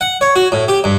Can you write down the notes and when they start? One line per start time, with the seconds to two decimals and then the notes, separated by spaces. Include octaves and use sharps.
0.01 F#5
0.21 C#5
0.36 F#4
0.52 A2
0.68 G4
0.84 G2